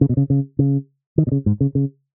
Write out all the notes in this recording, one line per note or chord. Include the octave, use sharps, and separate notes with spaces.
C#3
B2
C#3
C#3
C#3
D#3
B2
C#3
G#2
C#3
C#3